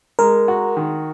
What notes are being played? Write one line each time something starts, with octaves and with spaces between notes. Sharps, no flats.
G#3 A#4
F#4
D#3